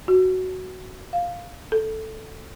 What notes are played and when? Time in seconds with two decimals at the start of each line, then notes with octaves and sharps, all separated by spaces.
0.08 F#4
1.13 F5
1.72 A4